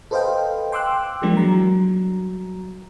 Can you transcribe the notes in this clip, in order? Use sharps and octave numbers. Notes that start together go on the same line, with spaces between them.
A4 B4 C5 D#5 F5 G5
G5 C6 D6 E6 F#6
E3 F3 G3 G#3 A#3 D4
F#3 G3 A#5